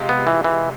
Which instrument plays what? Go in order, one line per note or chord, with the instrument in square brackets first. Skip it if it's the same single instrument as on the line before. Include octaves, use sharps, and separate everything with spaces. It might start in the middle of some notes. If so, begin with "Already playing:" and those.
Already playing: [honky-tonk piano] C3 G#3 F4
[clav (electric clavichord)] B3
E3
E3